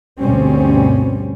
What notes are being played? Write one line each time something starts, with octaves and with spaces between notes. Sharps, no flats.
D2 G2 B2 G3 C4 C#4